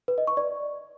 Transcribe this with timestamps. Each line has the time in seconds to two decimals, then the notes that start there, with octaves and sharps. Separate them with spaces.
0.08 B4
0.18 D#5
0.27 C#6
0.37 D5